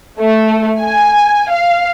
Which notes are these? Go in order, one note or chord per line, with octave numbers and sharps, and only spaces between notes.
A3
G#5
F5